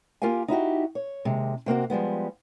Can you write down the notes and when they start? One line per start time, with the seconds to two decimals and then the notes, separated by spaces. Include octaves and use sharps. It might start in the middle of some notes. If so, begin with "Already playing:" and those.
0.22 A#3 F4 G4 A#4 F5 G#5
0.48 D#4 E4 F#4 G4
0.95 C#5
1.25 D#2 C3 G#3
1.66 C3 A#3 C4 F#4
1.90 F3 G3 G#3 B3